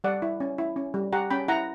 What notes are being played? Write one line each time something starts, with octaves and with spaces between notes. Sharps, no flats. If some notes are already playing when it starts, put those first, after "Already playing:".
G3 D5 F#5
E4
C#4
E4
C#4
G3
G4 F#5 A#5
C#4 G5 B5
E4 F#5 A#5